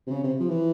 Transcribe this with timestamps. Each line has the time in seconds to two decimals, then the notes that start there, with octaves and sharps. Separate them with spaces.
0.07 C3
0.11 C#3
0.24 C3
0.40 F3
0.50 E3